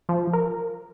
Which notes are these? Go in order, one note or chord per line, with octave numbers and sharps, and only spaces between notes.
F3
A#4